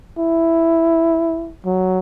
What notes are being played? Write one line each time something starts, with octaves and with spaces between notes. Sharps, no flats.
E4
F#3